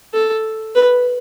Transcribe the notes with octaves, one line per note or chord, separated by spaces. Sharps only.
A4
B4